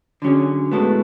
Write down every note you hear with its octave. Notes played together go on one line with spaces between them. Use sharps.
D3 F#3 C#4 G#4
A2 G#3 B3 F#4 A4